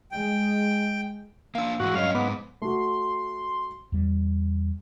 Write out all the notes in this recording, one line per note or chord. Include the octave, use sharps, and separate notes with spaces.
G#3 G5
A#3 D4 F5 E6
G#2 E3 G#3 F#4
G2 F#3 C#4 C#5 D#5 F5
G#2 B3 D6
A3 F#4 C6
E2 G3